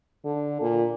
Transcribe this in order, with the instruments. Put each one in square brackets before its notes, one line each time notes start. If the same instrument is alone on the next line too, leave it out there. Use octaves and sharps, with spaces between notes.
[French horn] D3
A#2